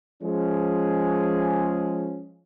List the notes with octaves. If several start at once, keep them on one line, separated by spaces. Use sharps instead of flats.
F3 G#3 C#4 G#4